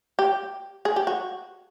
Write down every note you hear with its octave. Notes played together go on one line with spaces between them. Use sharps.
G4
G#4
G4
F#4